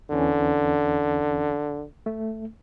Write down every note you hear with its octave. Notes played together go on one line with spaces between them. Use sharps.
E2 D3 E3 C#4
A3